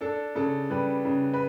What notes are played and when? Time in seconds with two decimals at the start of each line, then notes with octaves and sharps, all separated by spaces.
0.01 D4 A4
0.35 C#3 A4
0.70 G3 B4
1.05 C#3
1.34 B4